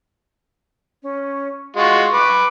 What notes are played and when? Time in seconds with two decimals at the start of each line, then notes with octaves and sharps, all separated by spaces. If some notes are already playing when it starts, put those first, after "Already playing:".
1.02 C#4
1.77 G#3 F4 F#4 C#6
2.13 B4 D6